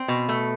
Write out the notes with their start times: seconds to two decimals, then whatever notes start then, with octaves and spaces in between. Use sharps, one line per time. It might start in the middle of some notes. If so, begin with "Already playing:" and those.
Already playing: C4
0.08 B2
0.29 A3